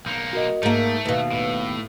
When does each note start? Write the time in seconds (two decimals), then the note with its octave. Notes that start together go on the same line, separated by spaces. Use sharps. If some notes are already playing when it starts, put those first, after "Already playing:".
0.06 B1 A#3 G6 C#7
0.33 F#4 A#4 D#5
0.63 G#2 A3 A#3 G6 D7
1.06 D#2 B2 B4 F5
1.32 A2